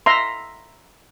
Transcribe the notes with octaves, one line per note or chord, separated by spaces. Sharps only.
E5 A#5 C6